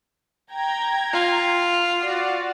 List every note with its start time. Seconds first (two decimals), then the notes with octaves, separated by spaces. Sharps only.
0.52 G5 A#5 G#6
1.13 F4
2.01 F#4 D5